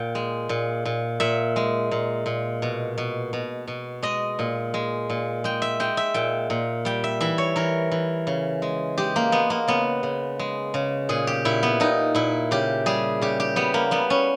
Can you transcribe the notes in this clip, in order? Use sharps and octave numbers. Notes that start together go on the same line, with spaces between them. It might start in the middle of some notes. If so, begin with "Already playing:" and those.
Already playing: A#2 G5
G#3
A#2
A#2
A#2 E5
G#3
A#2
A#2
B2
B2
B2
B2
G#3 D#5
A#2
G#3
A#2
G#3 G5
E5
G#3 G5
E5
A#2 G5
A#2
G3 G5
E5
E3 E5
C#5
E3 A#4
E3
C#3
G#3
G#3 G4
A#3
G#3 B3
A#3
C#3 B3
C#3
G#3
C#3
A#2 G#4
G4
A#2 E4
B3
A#2 D#4
A#2 E4
C#3 G4
G3 G#4
C#3 G4
G4
G3 B3
A#3
G3 B3
C#4